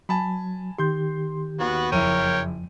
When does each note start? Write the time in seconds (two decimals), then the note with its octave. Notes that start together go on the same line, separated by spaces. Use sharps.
0.09 F#3 G#5 A5 B5
0.78 D#3 G4 C6 G6
1.60 D#2 B3 F#4
1.92 F#1 F2 F3 E4 A#4 C#5 G5 D#7